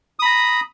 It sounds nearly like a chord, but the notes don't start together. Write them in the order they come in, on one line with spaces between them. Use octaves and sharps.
D#6 B5 A#5